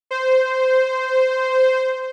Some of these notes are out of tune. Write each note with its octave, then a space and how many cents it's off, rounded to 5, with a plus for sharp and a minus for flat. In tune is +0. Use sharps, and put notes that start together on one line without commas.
C5 -10